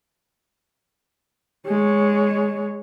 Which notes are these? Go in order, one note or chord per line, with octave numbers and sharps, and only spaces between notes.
G#3 C#5